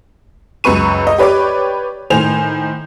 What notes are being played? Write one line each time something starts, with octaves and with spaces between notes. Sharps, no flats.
C#2 F#2 B4 C#6 D#7
D#5
G4 B4 C#5 D5 D6
A2 D#3 C5 G#5 F7